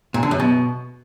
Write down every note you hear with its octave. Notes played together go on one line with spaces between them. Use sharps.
A#2
D3
F#2
B2